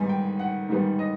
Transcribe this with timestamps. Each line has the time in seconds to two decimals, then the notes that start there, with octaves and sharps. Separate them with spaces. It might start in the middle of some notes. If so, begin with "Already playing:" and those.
Already playing: G#2 D#3 G3 B3 G#5
0.09 G5
0.39 F#5
0.69 G#2 D#3 G3 B3
0.99 D#5